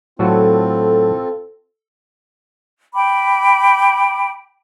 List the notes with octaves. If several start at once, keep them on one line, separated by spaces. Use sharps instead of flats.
A2 F#3 C4 F4 F#4 A4
G5 B5 D6